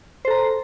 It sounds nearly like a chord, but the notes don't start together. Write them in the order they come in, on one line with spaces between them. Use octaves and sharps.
C5 A4 A#5